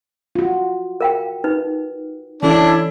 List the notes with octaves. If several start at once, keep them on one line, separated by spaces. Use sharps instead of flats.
F4 F#4
A#4 F5 G5
D#4 B4
E3 C#4 D4 E4 A4